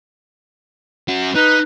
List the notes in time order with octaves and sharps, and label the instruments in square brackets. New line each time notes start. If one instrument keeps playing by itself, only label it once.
[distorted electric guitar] C#4 F#4
[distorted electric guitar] D#4 [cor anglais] B4